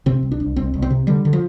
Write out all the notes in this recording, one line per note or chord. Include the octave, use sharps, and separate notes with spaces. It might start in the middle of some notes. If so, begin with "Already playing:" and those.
C3 C4
C2
D4
C2
C2 C4
C2
C4
C3
D3 G3
D3
F3